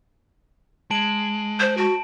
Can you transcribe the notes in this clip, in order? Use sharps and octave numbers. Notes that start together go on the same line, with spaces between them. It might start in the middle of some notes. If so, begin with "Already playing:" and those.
G#3 A5 D7 F#7
C5
F#4 A5 D7